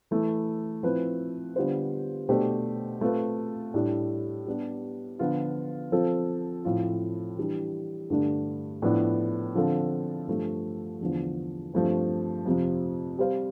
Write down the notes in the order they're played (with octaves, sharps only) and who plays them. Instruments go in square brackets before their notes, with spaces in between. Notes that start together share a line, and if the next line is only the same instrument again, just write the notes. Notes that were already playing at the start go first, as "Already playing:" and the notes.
[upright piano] E3 A3 E4
F3 C4 E4 B4
D3 G3 B3 F4 C5
B2 A3 D4 G4 C5
A3 C4 F4 B4
A2 G3 D4
G3 B3 D4 G4
D3 F3 B3 F4
F3 C4 F4 A4
A2 F3 C4 F4
E3 G3 D4 G4
G2 D3 A3 D4
A2 F3 B3 D4
D3 F3 C4 F4 A4
G2 F3 A3
E2 D3 F3
G2 F3 A3 C4
F2 C3 F3
G3 C4 G4 C5 F5